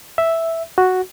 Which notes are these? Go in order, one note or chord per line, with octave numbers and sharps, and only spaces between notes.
E5
F#4